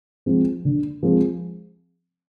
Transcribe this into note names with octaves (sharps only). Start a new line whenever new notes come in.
F3 G#3 C4
D3
F3 G#3 C4